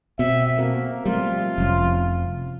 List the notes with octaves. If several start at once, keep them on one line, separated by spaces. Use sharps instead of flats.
B2 C4 E5
A#3 C4 F#4 A4
F3 G3 A3 C4 F4
F1 F3 C#4